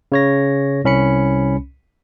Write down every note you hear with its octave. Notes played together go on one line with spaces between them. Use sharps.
C#3 C#5 A#6
C2 C#4 B5 C#7